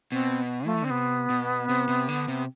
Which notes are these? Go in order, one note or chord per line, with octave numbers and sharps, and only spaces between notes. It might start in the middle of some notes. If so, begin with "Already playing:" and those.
B2 C4
F3 A3
E3
D3 C4
C3 B3
B2
C3
C3
D3
C3